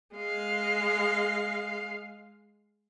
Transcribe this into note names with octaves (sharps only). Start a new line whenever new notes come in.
G#3 F5